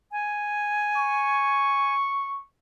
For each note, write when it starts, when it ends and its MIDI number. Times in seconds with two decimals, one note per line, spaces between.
0.12 1.94 80
0.96 2.43 85